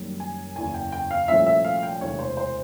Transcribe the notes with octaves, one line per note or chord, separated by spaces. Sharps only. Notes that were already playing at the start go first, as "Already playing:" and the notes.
Already playing: F#1 F#2 D#3 G3
G#5
F#1 E2 C#3 G#5
G5
G5
F5
C2 A#2 F3 A3 C#4 E5
E5
F5
G5
E1 D2 C3 E3 C#5
C5
C5